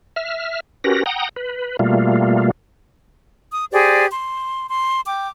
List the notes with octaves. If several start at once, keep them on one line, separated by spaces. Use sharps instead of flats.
E5 F6
C#4 F#4 G4 A#4 B4 A#6
F#5 G5 A#5 D#6
B4
B2 G3 A3 A#3 F4
D#6
G4 G#4 C5 D5
C6
C6
G5 D6